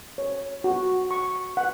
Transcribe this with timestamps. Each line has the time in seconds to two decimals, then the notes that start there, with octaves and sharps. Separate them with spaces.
0.18 C#5
0.64 F#4
1.11 C#6
1.57 F#5